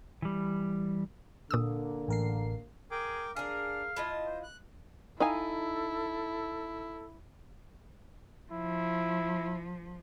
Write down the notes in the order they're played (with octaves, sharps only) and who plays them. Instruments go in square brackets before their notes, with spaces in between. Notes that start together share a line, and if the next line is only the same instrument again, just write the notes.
[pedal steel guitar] E3 G3
[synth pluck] A#2 D#6 E6 [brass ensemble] D3 A#3
[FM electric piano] A1 A#4 C7
[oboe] G#4 [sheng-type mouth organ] A#4 G5 D6
[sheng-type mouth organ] D4 [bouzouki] G#4 A#4 [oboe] F5
[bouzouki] E4 F4 D#5 [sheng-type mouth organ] A5
[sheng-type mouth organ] C5
F#6
[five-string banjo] D#4 F5 G#5 [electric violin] E4 [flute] A4
[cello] F3 [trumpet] E4